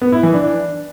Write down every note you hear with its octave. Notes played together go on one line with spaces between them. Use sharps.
B3
E4
E3
D4